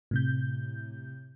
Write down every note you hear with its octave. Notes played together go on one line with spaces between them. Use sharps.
A2 C3 G6